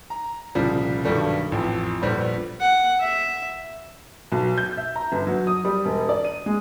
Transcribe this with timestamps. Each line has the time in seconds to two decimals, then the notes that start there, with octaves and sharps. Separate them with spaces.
0.10 A#5
0.55 C2 A#2 C#3 F3 G3
1.05 B1 G2 B2 D#3 G3 A3
1.52 A1 F2
2.02 A#1 G3 A3 B3 C5
2.61 F#5
3.00 E5
4.32 B1
4.58 G6
4.77 E5
4.96 A#5
5.12 G1
5.27 F#3
5.47 D#6
5.65 G3
5.85 E1
6.09 D5
6.25 D#7
6.46 G#3